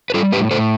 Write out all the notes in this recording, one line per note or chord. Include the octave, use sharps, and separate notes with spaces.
B4
G3 F4 A4
A2 G4 B4
A2 A4 C5